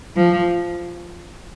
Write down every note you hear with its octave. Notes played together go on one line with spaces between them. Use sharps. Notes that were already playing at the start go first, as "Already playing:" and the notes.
F3